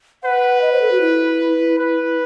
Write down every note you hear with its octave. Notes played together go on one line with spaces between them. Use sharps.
B4 F#5
D#5
C5
A4
F#4
E4
B4